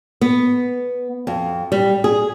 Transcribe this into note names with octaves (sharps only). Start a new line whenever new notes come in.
B3
F2
G3
G#4